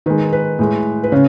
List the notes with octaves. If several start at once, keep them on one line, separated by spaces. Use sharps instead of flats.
D#3 G#3 B4
B4
A2 G#3
B4
C#3 C#5